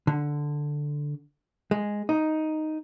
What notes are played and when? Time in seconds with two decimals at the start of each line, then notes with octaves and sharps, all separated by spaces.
0.07 D3
1.71 G#3
2.09 D#4